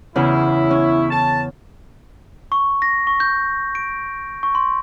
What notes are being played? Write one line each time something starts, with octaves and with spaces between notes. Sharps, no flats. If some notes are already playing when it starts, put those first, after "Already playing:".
E2 C#3 B3 E4
C#4
A5
C#6
A#6
C#6
G6
D7
C#6
C6